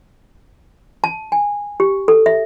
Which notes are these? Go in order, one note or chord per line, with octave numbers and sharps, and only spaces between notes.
A5
G#5
G4
A4
E5